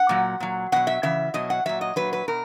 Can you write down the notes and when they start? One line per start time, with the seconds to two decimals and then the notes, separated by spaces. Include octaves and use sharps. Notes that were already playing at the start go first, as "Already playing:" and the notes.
Already playing: F#5
0.09 A#2 F#3
0.40 A#2 F#3
0.72 B2 F#3 F#5
0.87 E5
1.03 C#3 E3 E5
1.34 B2 F#3 D#5
1.50 F#5
1.66 A#2 F#3 E5
1.81 D#5
1.96 A#2 F#3 B4
2.13 B4
2.28 B2 A#4